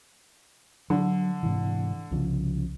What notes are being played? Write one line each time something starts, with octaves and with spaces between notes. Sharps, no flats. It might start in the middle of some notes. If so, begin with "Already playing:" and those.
D3 F#3
G#2 C3 E3
C2 C#3 F3